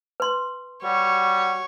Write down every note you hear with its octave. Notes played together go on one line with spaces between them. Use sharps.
B4 C6
G3 F#4 C#5